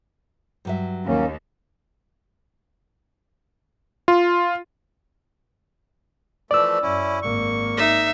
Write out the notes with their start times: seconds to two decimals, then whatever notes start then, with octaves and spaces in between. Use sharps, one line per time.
0.65 G2 F#3 E5
1.06 D#2 A#3 C#4
4.08 F4
6.51 E3 F3 A3 D5 E6
6.82 F#2 C#4 E4
7.22 G#1 A#3 C#6
7.77 D#4 E5